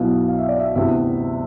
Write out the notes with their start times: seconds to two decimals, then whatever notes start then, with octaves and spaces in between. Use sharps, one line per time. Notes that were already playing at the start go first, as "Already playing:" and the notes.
Already playing: B1 B2 B3 E4 F5
0.28 F5
0.39 E5
0.49 D5
0.60 E5
0.76 D2 C3 E3 B3 E5